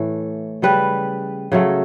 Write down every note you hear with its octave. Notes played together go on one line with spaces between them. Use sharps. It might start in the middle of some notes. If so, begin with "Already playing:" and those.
Already playing: A2 E3 A3
C#3 G3 B4
C#3 F#3 A3